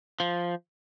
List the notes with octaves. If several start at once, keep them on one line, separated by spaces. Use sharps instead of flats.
F3